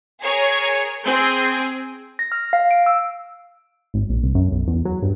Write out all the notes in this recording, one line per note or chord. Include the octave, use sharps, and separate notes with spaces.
G#4 A#4 C#5
C4 G#4
A#6
F6
F5
D7
E6
G#1
A#1
C2
F#2
B1
E2
F#3
G2